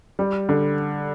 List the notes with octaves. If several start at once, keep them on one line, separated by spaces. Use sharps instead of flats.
G3
D3